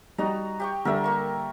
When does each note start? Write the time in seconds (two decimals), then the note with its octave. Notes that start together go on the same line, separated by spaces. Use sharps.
0.18 G3 D#4 F#4 D#5 A#5
0.60 G4 G5 C#6
0.85 D3 G3 A4 A#4 E5
1.04 A#3 C#6